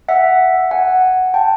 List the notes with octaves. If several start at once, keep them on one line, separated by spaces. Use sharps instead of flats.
E5 F#5
F#5 G#5
G5 A5